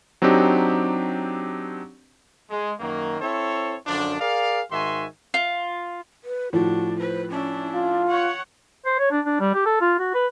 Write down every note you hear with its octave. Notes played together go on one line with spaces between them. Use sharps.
F#3 C4 D4 D#4 G4
G#3
F#2 D#3 F#3 A#3
C4 E4 A4 C5 C#5
F#2 D3 F3 D4
G#4 A#4 D5 F5
G#2 D#3 F#4 E5 G#5 C6
F4
B4
A2 F3 D4 F#4
B4 C5
C#4 D4 E4
F4
C#5 F#5 C#6
C5
C#5
D4
D4
G3
G4
A4
F4
F#4
B4